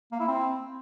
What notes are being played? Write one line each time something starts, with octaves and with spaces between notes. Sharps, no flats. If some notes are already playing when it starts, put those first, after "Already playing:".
A#3
E4
C4